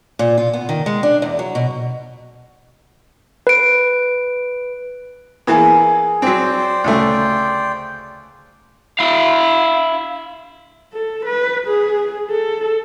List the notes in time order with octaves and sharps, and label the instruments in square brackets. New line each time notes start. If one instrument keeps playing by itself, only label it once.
[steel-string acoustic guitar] A#2
F4
B3
D#3
G#3
D4
E2
F#3
B2
[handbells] B4 D7
[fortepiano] E3 A#3 B3 [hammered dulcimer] G#4
[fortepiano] F#3 C4 [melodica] C5 D5 G5
[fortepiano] D2 C#3 A3
[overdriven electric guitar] E4 F5
[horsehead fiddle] A4
B4
G#4
A4